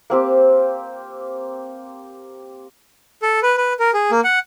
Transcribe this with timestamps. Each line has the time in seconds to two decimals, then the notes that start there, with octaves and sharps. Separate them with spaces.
0.10 A#3 C4 G4
3.22 A4
3.43 B4
3.57 B4
3.79 A#4
3.94 G#4
4.11 A#3
4.24 F#5